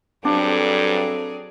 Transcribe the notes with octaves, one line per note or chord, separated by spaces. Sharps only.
G2 F#3 C4 D4 G#4 A4 D5